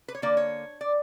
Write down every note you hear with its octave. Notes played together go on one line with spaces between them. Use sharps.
B4
C#5
D3 A#3 D5
C#5
D5